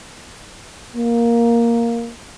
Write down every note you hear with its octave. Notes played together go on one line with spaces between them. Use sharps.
A#3